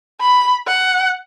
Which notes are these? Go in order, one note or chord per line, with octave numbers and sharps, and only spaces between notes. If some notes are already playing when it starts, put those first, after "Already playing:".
B5
F#5